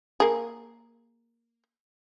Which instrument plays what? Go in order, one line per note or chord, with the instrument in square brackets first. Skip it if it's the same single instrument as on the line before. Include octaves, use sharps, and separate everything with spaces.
[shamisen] A#3 G#4